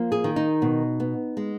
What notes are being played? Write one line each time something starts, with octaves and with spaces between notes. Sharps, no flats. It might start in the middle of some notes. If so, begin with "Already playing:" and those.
Already playing: F3 A#3
G#4
D#3
D#4
B2
B3
G#3